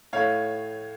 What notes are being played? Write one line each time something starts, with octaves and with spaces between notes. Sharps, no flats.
A2 A3 C#5 F5